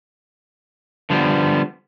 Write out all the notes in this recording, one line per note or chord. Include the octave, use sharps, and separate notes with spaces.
D3 F3 G3 B3